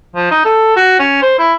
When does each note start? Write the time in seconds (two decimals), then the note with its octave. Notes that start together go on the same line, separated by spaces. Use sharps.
0.15 F3
0.31 D#4
0.45 A4
0.76 F#4
0.99 C#4
1.22 C5
1.39 E4